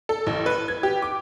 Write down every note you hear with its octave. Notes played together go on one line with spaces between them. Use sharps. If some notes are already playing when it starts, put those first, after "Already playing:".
A4
A1
B4
G#6
G4
D6